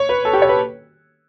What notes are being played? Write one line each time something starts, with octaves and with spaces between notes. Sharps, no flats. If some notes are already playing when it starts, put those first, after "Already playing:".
Already playing: C#5
B4
A4
G4
C#5
B4